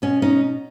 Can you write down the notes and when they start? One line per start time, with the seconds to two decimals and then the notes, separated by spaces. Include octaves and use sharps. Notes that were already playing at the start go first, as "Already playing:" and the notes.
0.02 B2 C#4
0.22 C#4 D#4